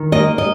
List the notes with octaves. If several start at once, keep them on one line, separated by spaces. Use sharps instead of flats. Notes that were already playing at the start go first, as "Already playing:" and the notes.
Already playing: D#3
A#3 D#5
D#5